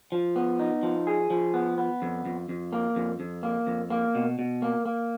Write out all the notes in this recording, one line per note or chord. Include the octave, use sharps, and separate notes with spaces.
F3
B3
D#4
F3
G#4
F3
B3
B3
F2
F2
F2
A#3
F2
F2
A#3
F2
A#3
B2
B2
A#3
A#3